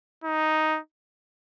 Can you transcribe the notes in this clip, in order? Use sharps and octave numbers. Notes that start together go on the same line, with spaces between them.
D#4